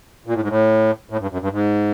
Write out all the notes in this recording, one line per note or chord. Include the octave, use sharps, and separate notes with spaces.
A#2
A2
G#2
A2
A2
G2
F#2
G2
G#2